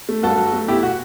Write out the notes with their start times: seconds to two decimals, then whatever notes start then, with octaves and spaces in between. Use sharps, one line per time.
0.09 A3
0.23 G2 F#4 A4
0.37 F#3
0.53 A3
0.68 B2 E4 G4
0.83 B2 F#4